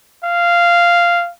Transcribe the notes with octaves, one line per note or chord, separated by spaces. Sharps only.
F5